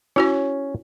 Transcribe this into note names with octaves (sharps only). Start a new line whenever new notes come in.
C#4 E4 F#4 C#5